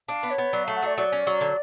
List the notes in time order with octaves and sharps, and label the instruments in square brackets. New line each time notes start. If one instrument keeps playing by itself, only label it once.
[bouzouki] D4 [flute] F5
[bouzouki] B3
[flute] C#5
[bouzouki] B3
[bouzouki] F#3 [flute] D5
[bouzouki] A3 [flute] F5
[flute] F#5
[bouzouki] F#3 [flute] D5
[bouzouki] F#3 [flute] D5
[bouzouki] C#4
F#3
D3